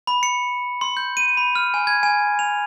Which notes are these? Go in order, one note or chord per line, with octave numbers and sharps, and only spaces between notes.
B5
C#7
C6
G6
D#7
B5
F6
G#5
G#6
G#5
F7